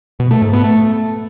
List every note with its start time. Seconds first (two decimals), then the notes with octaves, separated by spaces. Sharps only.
0.20 B2
0.31 A3
0.42 G#2
0.53 B3
0.64 A3